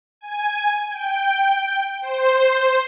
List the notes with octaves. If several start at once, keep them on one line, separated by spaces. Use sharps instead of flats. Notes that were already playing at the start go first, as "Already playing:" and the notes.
G#5
G5
C5